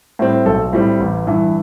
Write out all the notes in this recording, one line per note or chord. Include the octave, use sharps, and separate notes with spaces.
A2 G3 C4
B1 A4
A2 G3 C4
A1
G2 E3